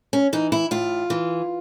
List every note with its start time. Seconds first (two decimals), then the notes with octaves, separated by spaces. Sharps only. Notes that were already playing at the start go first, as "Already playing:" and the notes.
0.13 C#4
0.33 E3 D#4
0.52 E4
0.71 A2 F4
1.10 E3